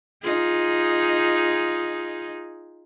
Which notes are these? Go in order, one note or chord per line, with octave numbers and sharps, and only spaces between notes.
D#4 F4 G#4